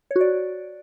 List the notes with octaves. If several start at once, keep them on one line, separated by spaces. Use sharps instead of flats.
C#5
F#4
D5